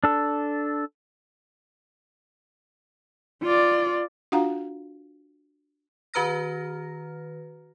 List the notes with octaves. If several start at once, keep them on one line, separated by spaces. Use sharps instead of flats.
D4 A4
F4 D5
D4 F4 F#4 F5 F#5 A#5
D#3 F#4 B4 A#5 F6 A#6